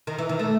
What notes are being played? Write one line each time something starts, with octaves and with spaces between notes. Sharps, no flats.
D#3
E3
D#3
A3